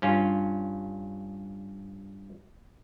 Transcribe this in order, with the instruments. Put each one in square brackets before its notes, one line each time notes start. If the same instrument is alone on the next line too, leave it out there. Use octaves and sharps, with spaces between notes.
[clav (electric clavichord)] G2 C#4 F4